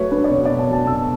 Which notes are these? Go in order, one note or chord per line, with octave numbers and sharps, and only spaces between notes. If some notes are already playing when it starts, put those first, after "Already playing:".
Already playing: F#3 A3 B4 C#5
D4 B4
D5
B2 C#5
B2 D5
A5
F#3
A5
B2 E6